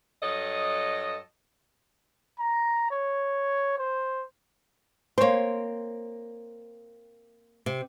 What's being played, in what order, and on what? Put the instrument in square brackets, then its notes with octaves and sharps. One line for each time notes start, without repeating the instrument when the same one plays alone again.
[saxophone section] G2 F#3 A4 D#5
[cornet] A#5
C#5
C5
[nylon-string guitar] A#3 C4 [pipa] C5 C#5
[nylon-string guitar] C3